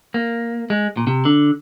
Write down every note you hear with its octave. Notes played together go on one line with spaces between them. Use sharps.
A#3
G#3
A#2
C3
D3